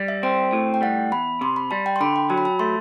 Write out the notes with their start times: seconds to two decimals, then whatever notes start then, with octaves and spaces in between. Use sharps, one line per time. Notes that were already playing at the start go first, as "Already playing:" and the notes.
Already playing: G3
0.08 E5
0.23 C4 G5
0.53 A2
0.74 G5
0.82 G3 F#5
1.12 E2 B5
1.41 C3 C6
1.56 B5
1.71 G3 A5
1.86 G5
1.96 C6
2.01 D3 B5
2.16 G5
2.30 F#3 A5
2.38 B5
2.45 A5
2.59 A3 C6